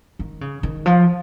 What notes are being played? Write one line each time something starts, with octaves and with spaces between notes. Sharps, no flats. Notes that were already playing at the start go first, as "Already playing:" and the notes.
D#3
C#3
D#3
F3